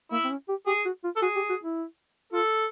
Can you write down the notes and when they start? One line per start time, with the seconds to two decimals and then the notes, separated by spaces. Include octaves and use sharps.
0.12 A#3 E4
0.24 C4
0.30 C#4
0.49 G4
0.67 G4 G#4
0.85 F#4
1.04 F4
1.16 A4
1.22 F#4 G#4
1.36 G4
1.50 F#4
1.64 E4
2.33 F4 A4